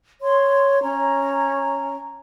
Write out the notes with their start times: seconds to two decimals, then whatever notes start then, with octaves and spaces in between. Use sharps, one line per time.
0.21 C#5 C6
0.82 C#4 A#5